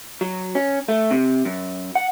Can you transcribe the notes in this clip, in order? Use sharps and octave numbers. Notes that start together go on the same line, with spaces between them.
F#3
C#4
A3
C3
F#2
F#5